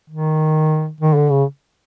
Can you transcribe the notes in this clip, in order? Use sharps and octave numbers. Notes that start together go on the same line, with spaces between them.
D#3
D#3
D3
C#3